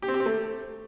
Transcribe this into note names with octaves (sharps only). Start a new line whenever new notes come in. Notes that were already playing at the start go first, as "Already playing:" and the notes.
G4
C4
G4
C4
A3